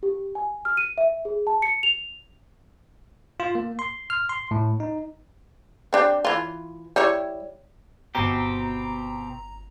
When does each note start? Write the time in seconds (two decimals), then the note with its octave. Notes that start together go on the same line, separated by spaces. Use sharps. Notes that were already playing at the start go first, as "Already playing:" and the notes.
0.03 G4
0.35 G#5
0.65 F6
0.77 D#7
0.98 E5
1.25 G#4
1.47 A5
1.62 C#7
1.83 F7
3.40 F4
3.55 A#3
3.79 C6
4.10 F6
4.29 C6
4.51 A2
4.80 D#4
5.93 C4 D4 G4
6.25 E3 F4
6.96 G3 E4 C#5
8.15 G1 B2 C4 G4 A#5